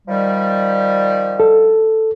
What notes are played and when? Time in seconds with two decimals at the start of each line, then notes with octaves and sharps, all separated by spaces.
0.08 D#3 F3 G3
1.40 A4